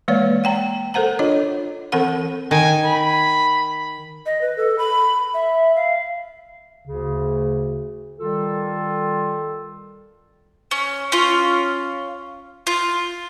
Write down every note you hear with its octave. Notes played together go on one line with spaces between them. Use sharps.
E3 G#3 A#3 B4 C#5 D5
F#5 G5 A#5
A4 A#4 C5 F#5 A#5
D4 F4 C#5 D#5
E3 C4 A4 A#4 F#5 B5
D#3 G#5
B5
D#5
B4
A4
B5
E5
F5
D2 C#3
D#3 G3 F4 A4
C#4
C#4 F4
F4